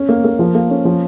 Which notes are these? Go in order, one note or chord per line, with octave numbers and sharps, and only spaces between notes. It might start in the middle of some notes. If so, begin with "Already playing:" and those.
Already playing: C#4
A#3
A#3
F3
A#3
C#4
F3